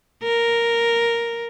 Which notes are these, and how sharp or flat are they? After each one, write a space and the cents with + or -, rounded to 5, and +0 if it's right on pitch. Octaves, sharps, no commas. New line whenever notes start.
A#4 +0